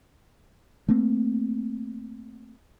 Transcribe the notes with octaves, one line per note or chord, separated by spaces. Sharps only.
A3 A#3 C4